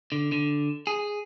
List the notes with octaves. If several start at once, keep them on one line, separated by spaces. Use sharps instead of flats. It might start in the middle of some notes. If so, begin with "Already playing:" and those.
D3
D3
G#4